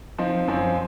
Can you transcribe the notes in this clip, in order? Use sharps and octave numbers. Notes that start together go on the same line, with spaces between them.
F3 C4 D#4
F#2 F3 C4